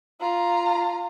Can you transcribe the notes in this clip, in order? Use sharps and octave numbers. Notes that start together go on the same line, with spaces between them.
F4 A#5